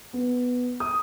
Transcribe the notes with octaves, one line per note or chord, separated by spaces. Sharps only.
B3
D#6